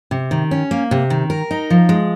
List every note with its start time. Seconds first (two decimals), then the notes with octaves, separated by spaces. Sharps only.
0.11 C3
0.31 D#3
0.51 C#4
0.71 A#3
0.91 C3
1.10 D#3
1.30 A#4
1.51 D#4
1.70 F3
1.89 G#3